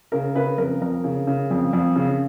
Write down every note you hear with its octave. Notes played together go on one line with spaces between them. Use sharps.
C#3 A#4
C#3 B4
F2 A#4
F2 A#4
C#3
C#3
F2
F2
C#3